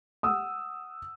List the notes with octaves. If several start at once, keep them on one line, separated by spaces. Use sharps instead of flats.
F#5 D#6 E6